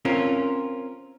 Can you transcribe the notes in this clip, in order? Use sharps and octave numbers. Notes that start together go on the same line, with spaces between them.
C4 C#4 F4 A#4